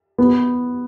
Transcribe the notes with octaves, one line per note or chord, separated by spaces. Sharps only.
B3